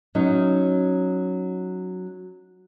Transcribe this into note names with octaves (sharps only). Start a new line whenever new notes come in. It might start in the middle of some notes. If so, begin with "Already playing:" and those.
F#3 C#4 D#4